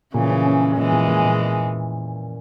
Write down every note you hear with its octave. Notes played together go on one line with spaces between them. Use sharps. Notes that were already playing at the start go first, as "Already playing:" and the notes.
A#2 C#3 E3
C#4
C#4
C#4
A#2 E3 G#3
A#2
A#2
A#2